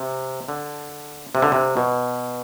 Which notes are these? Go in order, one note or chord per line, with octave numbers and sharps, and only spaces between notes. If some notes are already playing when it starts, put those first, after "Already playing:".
Already playing: C3
D3
C3
D3
C3
B2